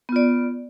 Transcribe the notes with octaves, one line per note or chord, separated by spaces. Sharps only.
B3 F4 D5